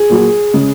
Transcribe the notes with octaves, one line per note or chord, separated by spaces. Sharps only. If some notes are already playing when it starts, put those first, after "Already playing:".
Already playing: G#4
A#2 F#3
C#3 G#3